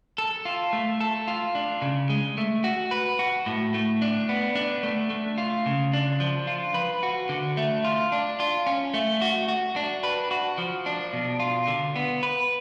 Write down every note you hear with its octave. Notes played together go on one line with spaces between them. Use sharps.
A4
F4
A3
A4
F4
D4
C#3
G#3
A3
F#4
B4
F#4
A2
A3
D4
B3
D4
A3
A3
F4
C#3
D4
F3
F4
B4
F#4
D3
A3
F4
D4
F4
C#4
A3
F#4
F#4
D4
B4
F#4
F3
D4
B2
F4
D3
B3
B4